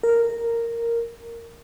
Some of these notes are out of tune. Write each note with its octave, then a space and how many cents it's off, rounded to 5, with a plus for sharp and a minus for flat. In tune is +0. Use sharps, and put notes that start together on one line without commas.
A#4 -5